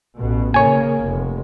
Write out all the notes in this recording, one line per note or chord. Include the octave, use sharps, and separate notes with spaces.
A1 B2
C#3 A#3 C#5 G#5
F1